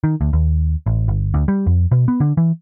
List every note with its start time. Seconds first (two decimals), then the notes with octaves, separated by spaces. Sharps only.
0.04 D#3
0.21 D2
0.33 D#2
0.86 A1
1.08 G1
1.34 D2
1.48 G3
1.67 F2
1.92 B2
2.08 B3
2.20 D3
2.37 E3